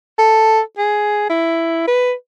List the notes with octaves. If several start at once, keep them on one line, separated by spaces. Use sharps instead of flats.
A4
G#4
E4
B4